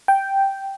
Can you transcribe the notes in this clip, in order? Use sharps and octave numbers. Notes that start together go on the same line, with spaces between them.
G5